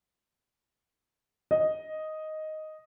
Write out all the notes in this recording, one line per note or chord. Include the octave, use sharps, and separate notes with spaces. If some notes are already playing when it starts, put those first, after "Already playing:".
D#5